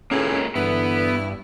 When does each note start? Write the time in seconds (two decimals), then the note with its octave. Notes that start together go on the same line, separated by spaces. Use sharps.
0.11 G#1 C#2 A2 A#3 C#4 G#4
0.55 G2 D3 E3 B3 E4